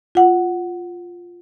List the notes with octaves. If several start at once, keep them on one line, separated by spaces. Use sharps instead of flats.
F4 F#5